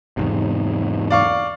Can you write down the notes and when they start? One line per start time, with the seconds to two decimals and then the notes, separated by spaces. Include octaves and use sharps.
0.17 E2 G#2 C3
1.11 D5 F5 C#6